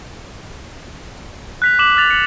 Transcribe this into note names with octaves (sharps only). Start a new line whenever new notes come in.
F#6 B6 F7
D6 F#6 E7 F#7
F6 F#6 A6 F7
C#7 F#7